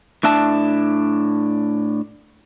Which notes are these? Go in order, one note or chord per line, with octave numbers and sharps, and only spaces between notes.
A2 D4 E5 A5